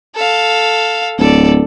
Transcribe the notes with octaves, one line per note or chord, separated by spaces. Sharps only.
A4 F5
D1 A4 D5